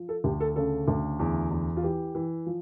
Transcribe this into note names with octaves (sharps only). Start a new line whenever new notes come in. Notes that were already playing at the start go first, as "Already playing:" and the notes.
Already playing: F3
A4
D2 G4
A4
C#3 A4
D2
E2
E2
F4
E3 G4
E3
F3